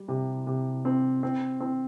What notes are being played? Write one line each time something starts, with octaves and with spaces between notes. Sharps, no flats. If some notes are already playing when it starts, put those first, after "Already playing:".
Already playing: G3
C3
C3
C4
C4
C4